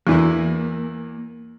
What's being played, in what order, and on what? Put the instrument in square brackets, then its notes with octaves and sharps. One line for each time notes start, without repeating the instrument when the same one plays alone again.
[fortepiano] E2 E3 E4 [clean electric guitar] A#3